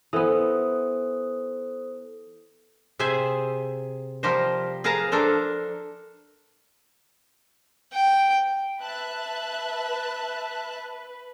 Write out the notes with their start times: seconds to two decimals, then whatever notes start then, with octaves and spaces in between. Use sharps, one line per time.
0.13 E3 B3 A4 C5 D#6
2.99 C3 G#4 C5 E5 G#5
4.23 F3 G3 G4 A#4 C5
4.84 G#4 A#4 B4 F5 A5 A#5
5.12 D4 A4 A#4 C5
7.94 G5
8.82 B4 E5 A5 F#6